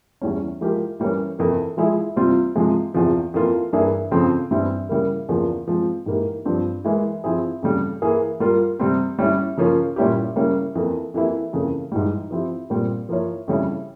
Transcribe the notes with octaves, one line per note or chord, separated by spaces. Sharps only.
E2 E3 G3 C#4
F3 G#3 E4 G4 A#4
E3 G3 A#3 C#4
F2 C3 E3 A#3
F3 G#3 E4 G#4
C3 G3 C4 F4 C5
C3 F3 G#3
E2 C3 F3
F2 E3 A#3 F4
G2 E3 A#3 E4 G#4
F2 C#3 F3 C4
G2 E3 G3 C4 E4
C#3 G3 A#3 E4 A#4
E2 C#3 F3 A#3
F3 G#3 C4
G#2 E3 A#3 E4 G4
G2 F3 C4 G4
E3 G#3 E4 A#4
F3 C4 E4 G#4
F2 C#3 G3
E3 A#3 E4 G#4
G3 A#3 F4 A#4
C3 G3 C4
G3 C#4 E4
C#3 F3 A#3 C#4
A#2 G3 C#4 E4 G4
C#3 G3 A#3 C#4 E4
F2 E3 A#3
F2 E3 A#3 E4 G4
F2 C#3 E3 A#3
G#2 E3 G3
F3 C4 E4 G4
A#2 G3 C4
F3 A#3 E4 A#4 C#5
F2 C#3 G3 C#4 E4